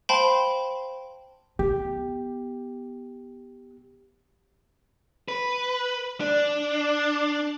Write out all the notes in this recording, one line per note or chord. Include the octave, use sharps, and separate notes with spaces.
C5 F5 G5 A5 B5 C6
B3 G4
B4
D4